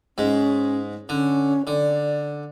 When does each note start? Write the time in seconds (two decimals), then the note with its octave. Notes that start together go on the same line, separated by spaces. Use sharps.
0.18 G#2 G#3 C#4
1.09 D3 C#4
1.67 D3 D5